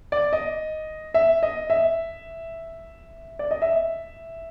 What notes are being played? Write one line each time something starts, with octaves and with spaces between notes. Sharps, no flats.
D5
D#5
E5
D#5
E5
D5
D#5
E5